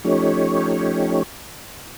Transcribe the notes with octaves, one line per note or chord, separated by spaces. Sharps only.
F3 A3 C#4 D#4 G4 C#5